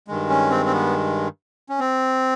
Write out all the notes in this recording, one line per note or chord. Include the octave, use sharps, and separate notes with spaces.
G2 D#3 G#3
C#4
C4
C4
B3
C#4
C4